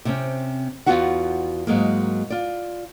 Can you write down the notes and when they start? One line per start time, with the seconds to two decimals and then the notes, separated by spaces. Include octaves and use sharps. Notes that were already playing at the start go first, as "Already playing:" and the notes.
0.05 C3 C4 C#4
0.86 E2 C#3 B3 F4 F#4 F#5
1.67 G#2 F#3 G#3 A#3
2.30 F4 D5